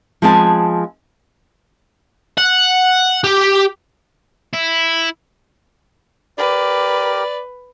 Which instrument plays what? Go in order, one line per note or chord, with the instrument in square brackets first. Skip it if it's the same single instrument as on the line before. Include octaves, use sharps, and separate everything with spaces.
[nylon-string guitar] F3 G#3 B3 C4 G#5 A5
[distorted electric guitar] F#5
G4
E4
[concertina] G4 A#4 D6 [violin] B4 [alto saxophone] D5